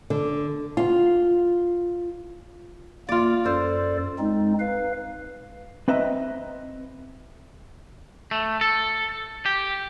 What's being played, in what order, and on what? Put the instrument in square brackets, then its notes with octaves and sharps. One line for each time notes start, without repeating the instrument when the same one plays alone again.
[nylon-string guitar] D3
F4
[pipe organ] A#3 [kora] F4 D5
[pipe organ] F#2 A4 D5 [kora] C5
[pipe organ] G#3 C4 D#4
B4 F5
[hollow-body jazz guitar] C4 B4 D#5 E5 A#5
[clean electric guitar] A3
A4
G4